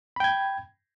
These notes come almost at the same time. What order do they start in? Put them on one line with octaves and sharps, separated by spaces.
B5 G5 G#6